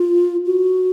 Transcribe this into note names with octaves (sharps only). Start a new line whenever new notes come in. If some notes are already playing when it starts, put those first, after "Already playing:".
Already playing: F4
F#4